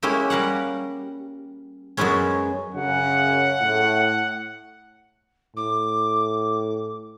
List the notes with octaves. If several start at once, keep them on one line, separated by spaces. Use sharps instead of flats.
G#3 A#3 C#4 E4 G4 E5
G3 A#4 F5 F#5
F#2 F#3 G#3 B3 C#4
F#2 C#3 F#5
A2
A2 D6